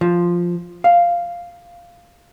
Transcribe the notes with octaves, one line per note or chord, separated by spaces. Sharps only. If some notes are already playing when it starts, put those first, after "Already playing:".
F3
F5